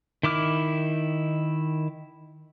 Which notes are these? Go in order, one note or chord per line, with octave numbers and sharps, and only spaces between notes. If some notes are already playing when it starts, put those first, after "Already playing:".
D#3 E4 D6 F6